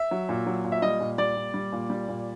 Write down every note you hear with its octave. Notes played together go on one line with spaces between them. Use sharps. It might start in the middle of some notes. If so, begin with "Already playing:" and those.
Already playing: E5
F#3
A#2
F#3
A#2
E5
G3 D#5
A#2
G3 D5
A#2
G3
A#2
G3
A#2